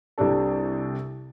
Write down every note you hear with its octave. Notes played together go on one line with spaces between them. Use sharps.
C2 C3 G3 D4 A4